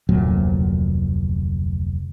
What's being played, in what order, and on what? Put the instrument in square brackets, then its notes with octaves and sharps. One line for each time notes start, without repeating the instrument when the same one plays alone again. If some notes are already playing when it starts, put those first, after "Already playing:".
[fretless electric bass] F1 D2 A#2 F#3